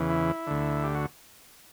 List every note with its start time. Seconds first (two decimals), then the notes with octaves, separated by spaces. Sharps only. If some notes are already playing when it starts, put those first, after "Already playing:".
Already playing: E2 C#3 E3
0.10 E4
0.47 D2 D3
0.83 G4
0.95 F#4